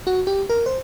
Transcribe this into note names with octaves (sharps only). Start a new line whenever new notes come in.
F#4
G4
A#4
C5